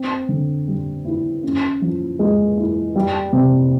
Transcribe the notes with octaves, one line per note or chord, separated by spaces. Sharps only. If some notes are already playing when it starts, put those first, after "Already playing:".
Already playing: C4
D3
G3
E4
C#4
F3
G#3
E4
G3
C3